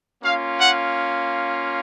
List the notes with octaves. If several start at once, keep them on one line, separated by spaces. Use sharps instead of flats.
A#3 C#4 F4 F5
F#5